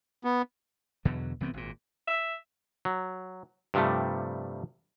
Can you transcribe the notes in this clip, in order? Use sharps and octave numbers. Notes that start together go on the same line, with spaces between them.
B3
E2 B2 D3 F#3
C2 E3 B3 C4
G#1 A#2
E5
F#3
G2 C3 F3 G3 A3